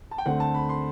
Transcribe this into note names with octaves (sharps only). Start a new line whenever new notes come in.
A5
G5
D2 D3 A3 C4 F#5
A5
B5
C6